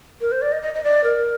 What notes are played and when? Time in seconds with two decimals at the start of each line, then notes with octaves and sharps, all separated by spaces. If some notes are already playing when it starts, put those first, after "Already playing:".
0.21 A#4
0.32 C5
0.42 D5
0.52 D#5
0.63 D#5
0.75 D#5
0.84 D5
1.04 A#4